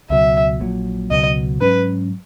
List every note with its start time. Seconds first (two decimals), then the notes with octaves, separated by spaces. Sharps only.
0.10 C#2 B2 F#3 E5
0.60 A#1 A#2 F#3
1.10 C#2 B2 F#3 D#5
1.61 G#2 F#3 C#4 B4